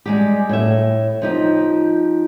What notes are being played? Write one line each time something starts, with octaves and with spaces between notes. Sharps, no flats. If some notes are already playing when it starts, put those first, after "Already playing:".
G3 G#3 G4
A2 E5
F3 D#4 G4